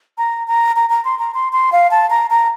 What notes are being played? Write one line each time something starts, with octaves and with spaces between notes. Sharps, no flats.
A#5
A#5
A#5
A#5
C6
A#5
C6
C6
F5
A5
A#5
A#5